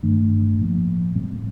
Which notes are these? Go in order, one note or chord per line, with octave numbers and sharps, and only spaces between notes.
G2 D#3 A3 D4
A2 F3 A#3
A2 G3 C4